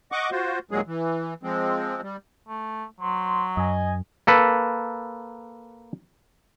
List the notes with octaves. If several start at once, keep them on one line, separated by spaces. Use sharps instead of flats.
D#5 F#5 C#6 D6
F4 F#4 C5
D#2 A#2 F#3 G#3 G#4
E3
F3 G#3 C4
G3
A3
F#3 C5 C6
F#2 D#5 G#5
A#3 A4 B4